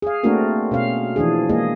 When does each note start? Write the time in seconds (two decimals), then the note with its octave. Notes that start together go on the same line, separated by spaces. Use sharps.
0.02 G#4 F5
0.23 A3 A#3 C4 D4 F#4 A#4
0.71 B2 C#4 F5
1.16 E3 F3 D4 G#4
1.50 G#3 A#3 G#4 D#5